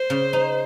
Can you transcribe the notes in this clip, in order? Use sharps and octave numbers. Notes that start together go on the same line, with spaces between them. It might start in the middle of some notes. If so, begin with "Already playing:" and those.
Already playing: C5
C#3
D#4